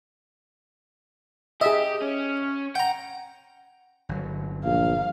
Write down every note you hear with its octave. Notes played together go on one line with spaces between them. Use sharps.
G4 G#4 D#5 E5
C#4
F#5 G5 A#5
G1 F#3
A#1 F5